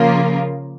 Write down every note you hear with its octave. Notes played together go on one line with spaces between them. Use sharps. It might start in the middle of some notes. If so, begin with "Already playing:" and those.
Already playing: C#3 F3 A#3 F4 A#4